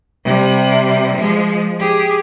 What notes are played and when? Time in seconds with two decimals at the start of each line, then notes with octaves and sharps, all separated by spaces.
0.25 C3 G3
1.18 F3 G#3
1.80 G4 G#4